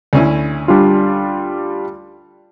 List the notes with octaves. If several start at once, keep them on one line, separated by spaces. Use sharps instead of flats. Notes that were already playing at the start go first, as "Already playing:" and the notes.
D2 C#4 E4
G3 D4 F4